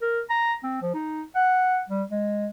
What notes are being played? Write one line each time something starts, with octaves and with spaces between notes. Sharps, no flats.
A#4
A#5
C4
F3
D#4
F#5
G3
G#3